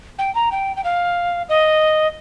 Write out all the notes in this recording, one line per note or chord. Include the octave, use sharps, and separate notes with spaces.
G5
A#5
G5
G5
F5
D#5